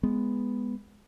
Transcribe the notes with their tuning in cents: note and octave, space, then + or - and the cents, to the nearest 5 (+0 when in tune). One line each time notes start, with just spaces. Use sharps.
G#3 +0 B3 +0